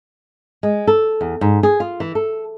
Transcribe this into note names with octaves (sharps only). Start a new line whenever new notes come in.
G#3
A4
E2
G#2
G#4
F4
E3
A4